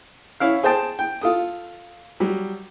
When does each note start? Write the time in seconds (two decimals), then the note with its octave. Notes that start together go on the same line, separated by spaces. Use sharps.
0.40 C#4 E4 F5
0.63 G#4 C5 G5 A5
0.99 G5
1.21 F4 A4 D#6
2.20 F#3 G3